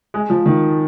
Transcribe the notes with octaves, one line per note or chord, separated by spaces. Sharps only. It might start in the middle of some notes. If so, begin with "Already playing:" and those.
G#3
F3
D#3